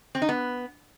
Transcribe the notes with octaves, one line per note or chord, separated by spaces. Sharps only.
C4
D#4
B3